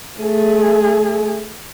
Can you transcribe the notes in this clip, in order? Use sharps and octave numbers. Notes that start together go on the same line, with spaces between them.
A3 G#4